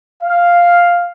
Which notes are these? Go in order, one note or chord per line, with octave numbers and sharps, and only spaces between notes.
F5